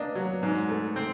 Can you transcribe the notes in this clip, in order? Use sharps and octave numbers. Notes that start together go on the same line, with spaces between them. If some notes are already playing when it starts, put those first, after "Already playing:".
Already playing: A#3 D4 D#5
F#3
G#2
A3
C4